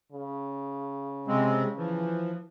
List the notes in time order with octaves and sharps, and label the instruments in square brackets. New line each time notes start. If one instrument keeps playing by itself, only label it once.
[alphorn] C#3
[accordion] C3 G#3 C4
E3 F3